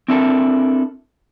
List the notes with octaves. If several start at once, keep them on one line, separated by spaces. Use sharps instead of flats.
C4 D4 E4 G4 A4 A#4